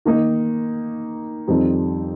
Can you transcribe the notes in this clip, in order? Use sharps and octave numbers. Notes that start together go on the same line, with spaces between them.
D#3 A#3 D#4
F2 D#3 G3 C4 D#4